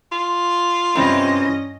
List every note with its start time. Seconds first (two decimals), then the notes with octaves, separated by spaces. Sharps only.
0.12 F4
0.95 G2 C3 E3 C4 C#4 D#5